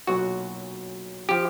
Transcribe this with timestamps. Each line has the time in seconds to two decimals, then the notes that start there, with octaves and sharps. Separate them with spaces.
0.07 B1 A#2 F#3 F#4
1.29 F3 G4